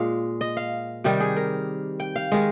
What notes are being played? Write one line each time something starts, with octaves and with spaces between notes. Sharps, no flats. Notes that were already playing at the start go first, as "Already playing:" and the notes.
Already playing: A#2 G#3 F5
D#5
F5
C3 D#3 G3 G4
G#4
A#4
G5
F5
D#3 G#3